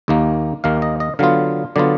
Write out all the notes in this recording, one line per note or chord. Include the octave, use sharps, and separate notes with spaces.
D#2 D#3 A#3
D#2 D#3 A#3 F5
D#5
D#5
D3 F#3 B3 F4 F5
D3 F#3 B3 F4 D5